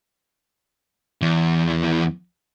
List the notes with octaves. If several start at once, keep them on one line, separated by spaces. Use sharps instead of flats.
E2 E3